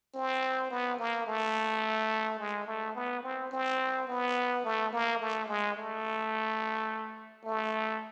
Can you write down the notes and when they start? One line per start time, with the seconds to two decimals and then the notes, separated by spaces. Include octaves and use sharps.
0.14 C4
0.70 B3
0.99 A#3
1.27 A3
2.39 G#3
2.67 A3
2.95 B3
3.23 C4
3.51 C4
4.08 B3
4.64 A3
4.93 A#3
5.20 A3
5.48 G#3
5.77 A3
7.45 A3